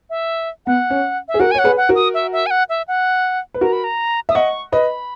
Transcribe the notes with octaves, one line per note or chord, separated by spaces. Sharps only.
E5
B3 F#5
C#4
E5
G#4
F#4 A#4 F#5
G#5
C#5 F#5
G#4 B4
F#5
F#4 A#4
D#6
E5
E5
G#5
F#5
E5
F#5
B4
F#4 A#4 A#5
B5
A#5
E5 D#6
D#5 F#5 C#6
B4 D#5 B5